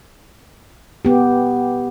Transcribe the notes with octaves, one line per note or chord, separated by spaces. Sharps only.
B3 G4